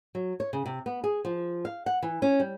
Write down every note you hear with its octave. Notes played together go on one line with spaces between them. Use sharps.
F#3
C#5
C#3
C3
B3
G#4
F3
F5
F#5
E3
C#4
G3